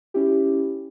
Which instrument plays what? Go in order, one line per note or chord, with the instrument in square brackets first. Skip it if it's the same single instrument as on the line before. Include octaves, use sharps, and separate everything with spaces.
[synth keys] C#4 E4 G4